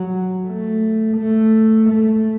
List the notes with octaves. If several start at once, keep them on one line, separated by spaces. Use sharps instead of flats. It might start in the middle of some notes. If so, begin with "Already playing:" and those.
Already playing: F#3
A3
A3
A3